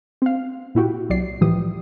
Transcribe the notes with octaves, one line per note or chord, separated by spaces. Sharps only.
C4 F5
A#2 E4 F#4 G4
C2 F#3 D5 C7
A2 E3 F3 G4 D#6